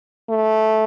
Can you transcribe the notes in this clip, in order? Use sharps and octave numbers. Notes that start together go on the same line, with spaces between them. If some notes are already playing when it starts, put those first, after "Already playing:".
A3